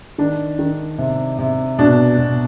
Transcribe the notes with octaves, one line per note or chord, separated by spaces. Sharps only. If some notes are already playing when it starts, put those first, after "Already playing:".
D#3 D4
D#3
C3
C3
B2 D4
B2